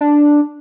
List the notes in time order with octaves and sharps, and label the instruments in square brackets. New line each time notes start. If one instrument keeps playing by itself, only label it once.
[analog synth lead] D4